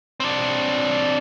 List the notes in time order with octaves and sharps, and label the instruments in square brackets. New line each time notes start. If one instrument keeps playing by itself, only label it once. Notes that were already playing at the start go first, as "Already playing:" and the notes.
[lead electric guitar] C4 D4